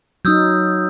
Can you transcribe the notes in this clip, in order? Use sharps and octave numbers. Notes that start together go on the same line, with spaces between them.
F#3 D#4 D#6 E6 G6